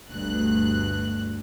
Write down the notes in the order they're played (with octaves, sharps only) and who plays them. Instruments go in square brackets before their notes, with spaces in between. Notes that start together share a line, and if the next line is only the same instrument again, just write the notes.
[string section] G1 D2 G2 B2 F#6